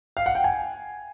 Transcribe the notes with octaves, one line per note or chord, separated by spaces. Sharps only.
F5
F#5
G5
G#5